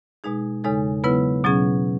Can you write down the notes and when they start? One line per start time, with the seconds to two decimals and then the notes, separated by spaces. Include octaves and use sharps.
0.24 B2 G#3 D#4 G#4
0.64 E2 C#3 G#3 D#4 A4
1.04 C#3 F#3 B3 E4 B4
1.44 B2 F#3 C#4 G#4